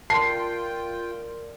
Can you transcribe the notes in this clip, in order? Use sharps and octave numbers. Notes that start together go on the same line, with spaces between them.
F4 A#4 D5 G5 A5 C6 C7